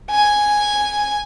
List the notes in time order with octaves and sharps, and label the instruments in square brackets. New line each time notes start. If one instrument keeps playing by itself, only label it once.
[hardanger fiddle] G#5